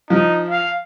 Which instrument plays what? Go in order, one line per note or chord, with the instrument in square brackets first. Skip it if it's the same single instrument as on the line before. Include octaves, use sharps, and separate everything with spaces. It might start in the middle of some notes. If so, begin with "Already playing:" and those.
[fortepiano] F3 [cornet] D#4
[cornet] F5